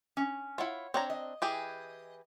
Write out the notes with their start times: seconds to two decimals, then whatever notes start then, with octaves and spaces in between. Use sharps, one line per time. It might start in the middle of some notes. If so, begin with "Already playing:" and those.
0.17 C#4
0.58 E4 F4 C#5 F#5
0.94 C4 D4 C#5 A#5
1.10 D#5
1.42 E3 G4 G#4